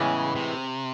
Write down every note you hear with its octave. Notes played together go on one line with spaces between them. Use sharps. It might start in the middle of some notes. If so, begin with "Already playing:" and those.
Already playing: A2 C#3 E3 G#3 B3
C3